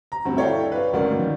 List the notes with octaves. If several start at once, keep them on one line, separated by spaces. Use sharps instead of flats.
A#5
D2 G2 C4
E4 A4 C#5 D5 F5 G5
B4 F5
G#1 D2 C#4 A#4 D5
D#3